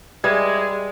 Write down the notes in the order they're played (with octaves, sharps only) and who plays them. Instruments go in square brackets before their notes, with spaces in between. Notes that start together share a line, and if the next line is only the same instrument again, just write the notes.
[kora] G3 [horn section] G#3 [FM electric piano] G#4 B4 E5 [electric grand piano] G#6